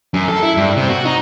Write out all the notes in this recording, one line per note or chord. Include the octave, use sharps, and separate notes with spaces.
F#2
A4
E4
G2
C3
F#4
D#4